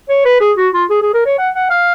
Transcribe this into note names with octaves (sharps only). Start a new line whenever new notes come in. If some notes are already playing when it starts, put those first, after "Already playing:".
C#5
B4
G#4
F#4
F4
G#4
G#4
A#4
C#5
F#5
F#5
F5